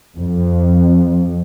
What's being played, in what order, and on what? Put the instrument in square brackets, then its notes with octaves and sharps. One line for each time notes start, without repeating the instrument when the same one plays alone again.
[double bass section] F2